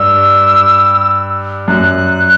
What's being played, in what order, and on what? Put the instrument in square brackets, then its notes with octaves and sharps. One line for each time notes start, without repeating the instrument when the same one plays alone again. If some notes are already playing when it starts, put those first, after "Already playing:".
Already playing: [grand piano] G2 [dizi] E6
[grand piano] F#2 [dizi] F#6